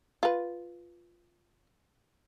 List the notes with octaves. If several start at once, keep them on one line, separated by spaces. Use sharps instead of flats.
F4 B4